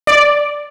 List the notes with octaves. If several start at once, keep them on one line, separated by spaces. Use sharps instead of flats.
D5